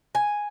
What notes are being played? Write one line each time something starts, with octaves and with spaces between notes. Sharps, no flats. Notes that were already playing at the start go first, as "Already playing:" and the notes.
G#5